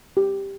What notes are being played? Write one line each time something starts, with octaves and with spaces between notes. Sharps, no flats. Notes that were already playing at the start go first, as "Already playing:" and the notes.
G4